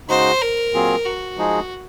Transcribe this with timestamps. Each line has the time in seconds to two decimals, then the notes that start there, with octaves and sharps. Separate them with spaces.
0.09 C#3 G#3 D#4 F#4 C5
0.42 A#4
0.73 A#2 F#3 C4 F4 G#4
1.05 F#4
1.37 F3 G#3 D#4 G#4